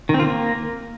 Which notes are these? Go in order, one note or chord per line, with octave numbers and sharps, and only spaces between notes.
D#3
C4
F4
A#3